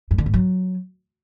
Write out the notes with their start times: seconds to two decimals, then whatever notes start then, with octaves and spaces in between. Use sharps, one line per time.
0.11 G2
0.18 D3
0.26 G#2
0.34 F#3